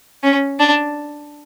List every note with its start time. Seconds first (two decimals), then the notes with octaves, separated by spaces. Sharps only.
0.23 C#4
0.60 D4